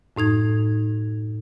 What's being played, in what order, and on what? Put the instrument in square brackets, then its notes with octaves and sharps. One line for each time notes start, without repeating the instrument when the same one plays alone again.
[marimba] F#2 A2 D#4 G#6